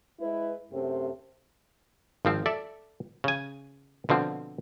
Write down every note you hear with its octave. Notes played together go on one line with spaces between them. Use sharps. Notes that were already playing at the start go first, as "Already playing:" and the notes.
G#3 E4 B4
F#2 C3 A3 C4
G#1 F3 C4
A4 D5 E5
C#3 G#5
B2 D3 F3 C4